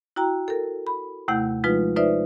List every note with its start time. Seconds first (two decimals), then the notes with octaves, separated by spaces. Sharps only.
0.16 E4 F#4 G5 A#5
0.48 A4 A#4
0.87 B5
1.28 D#2 C3 A3 E4 F#5 G6
1.64 F3 G#3 D#4 F4 B4
1.96 D#4 F4 B4 C5 D5 E5